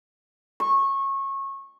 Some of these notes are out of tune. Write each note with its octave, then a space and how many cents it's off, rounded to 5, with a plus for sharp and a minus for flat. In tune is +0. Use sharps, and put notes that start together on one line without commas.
C#6 -25